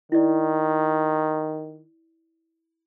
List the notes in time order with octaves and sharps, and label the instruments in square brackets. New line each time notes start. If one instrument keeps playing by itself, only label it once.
[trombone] D#3 [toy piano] E4 D5